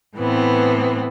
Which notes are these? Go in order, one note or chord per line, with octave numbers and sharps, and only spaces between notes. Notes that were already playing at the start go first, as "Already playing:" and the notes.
A2 E3 B3 C4